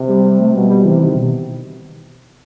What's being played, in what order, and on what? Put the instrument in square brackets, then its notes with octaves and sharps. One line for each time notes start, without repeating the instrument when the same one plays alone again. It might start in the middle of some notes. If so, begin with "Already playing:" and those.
Already playing: [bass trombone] C3
[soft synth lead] G3
G3
A3
[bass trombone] B2 [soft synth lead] G3
[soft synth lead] G3
[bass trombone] C3 [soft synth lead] E3
[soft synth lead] D#3
B2